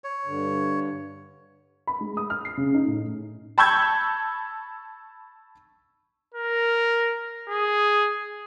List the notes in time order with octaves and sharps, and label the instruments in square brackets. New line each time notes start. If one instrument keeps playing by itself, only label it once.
[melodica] C#5
[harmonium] G2 D3
[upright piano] B5
G#3
D#6
F6
C7
C#3
D#4
A2
[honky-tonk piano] A5 B5 C#6 E6 G6 G#6
[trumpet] A#4
G#4